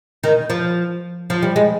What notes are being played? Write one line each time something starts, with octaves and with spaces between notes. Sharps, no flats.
D#3
F3
F3
G3
G#3